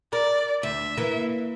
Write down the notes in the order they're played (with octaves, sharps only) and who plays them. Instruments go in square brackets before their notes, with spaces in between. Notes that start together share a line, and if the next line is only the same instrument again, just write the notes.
[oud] A#4 [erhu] D5
[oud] D2 [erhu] E5
[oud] E3 A#3